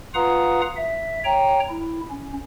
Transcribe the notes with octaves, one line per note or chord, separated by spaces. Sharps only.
F4 B4 F5 F#5 A#5 D#6
E5
C#5 G5 A#5
E4
C#4